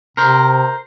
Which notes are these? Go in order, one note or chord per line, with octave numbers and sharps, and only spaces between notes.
C3 A#4 C5